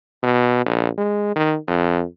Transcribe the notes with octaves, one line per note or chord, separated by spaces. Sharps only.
B2
A#1
G#3
D#3
F2